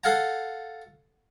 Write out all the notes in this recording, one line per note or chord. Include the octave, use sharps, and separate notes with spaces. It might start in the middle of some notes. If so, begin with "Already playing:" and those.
A4 F5 F#5 G#5 A#5